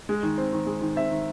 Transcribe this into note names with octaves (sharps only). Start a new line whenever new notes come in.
G#3
D#3
C4
D#3
G#3
D#3
C4 E5
D#3